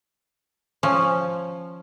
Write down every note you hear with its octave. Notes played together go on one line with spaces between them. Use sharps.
F3 C#4